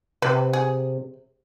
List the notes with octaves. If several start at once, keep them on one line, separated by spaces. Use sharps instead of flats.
C3 B4
G#4